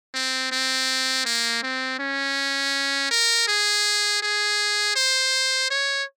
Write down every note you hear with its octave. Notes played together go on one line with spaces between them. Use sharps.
C4
C4
A#3
C4
C#4
A#4
G#4
G#4
C5
C#5